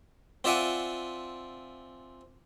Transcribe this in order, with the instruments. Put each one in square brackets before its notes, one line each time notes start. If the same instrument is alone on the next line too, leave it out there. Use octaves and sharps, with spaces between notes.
[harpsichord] C4 F4 D5 E5 F#5 G#5